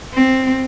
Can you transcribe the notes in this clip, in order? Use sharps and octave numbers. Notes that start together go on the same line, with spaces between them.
C4